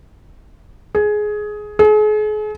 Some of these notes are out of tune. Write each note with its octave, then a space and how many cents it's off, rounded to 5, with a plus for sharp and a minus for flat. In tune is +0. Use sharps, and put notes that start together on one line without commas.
G#4 +15
G#4 +40